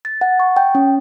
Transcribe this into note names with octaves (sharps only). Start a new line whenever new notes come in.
A6
F#5
C#6
G5
C#4